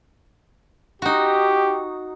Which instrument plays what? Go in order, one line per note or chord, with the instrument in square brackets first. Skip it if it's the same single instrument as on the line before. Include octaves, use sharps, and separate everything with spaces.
[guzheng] D#4 F#4 [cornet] G4